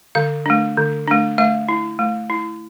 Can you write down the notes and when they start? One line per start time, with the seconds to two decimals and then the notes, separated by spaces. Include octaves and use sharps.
0.15 D3 F5
0.46 A3 D4
0.77 D3
1.07 A3 D4
1.38 A3 E5
1.69 E4
1.99 A3
2.30 E4